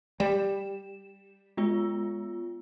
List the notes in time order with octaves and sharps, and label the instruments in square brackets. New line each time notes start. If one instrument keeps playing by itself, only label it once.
[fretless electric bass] G3 [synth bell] E7
[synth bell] G#3 B3 F4